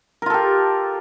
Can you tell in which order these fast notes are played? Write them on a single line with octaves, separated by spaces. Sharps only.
A#4 F4 A4 G4